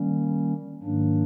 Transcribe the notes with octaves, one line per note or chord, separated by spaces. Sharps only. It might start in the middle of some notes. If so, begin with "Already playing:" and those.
Already playing: D#3 G3 A#3 C#4
G#2 D#3 F#3 A#3 D4